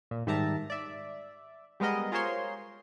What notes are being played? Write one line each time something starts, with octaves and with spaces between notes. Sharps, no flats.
A#2
G#2 D#3 G3 E5 A5 A#5
D5 E5
G3 G#3 B3 A#4 D#5
F4 G#4 A#4 C5 C#5 C6